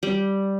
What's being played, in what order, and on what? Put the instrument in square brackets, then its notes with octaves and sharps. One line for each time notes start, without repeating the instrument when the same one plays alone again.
[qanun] G3